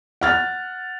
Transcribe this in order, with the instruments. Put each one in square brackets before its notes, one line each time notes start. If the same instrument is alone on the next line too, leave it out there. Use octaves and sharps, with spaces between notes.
[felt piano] F#5 F6 A6